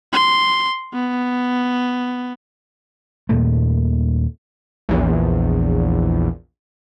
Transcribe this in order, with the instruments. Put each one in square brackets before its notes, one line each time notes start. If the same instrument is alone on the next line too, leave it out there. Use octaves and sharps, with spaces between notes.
[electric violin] C6
B3
[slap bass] D#2 A#2 A3
[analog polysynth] A#1 E2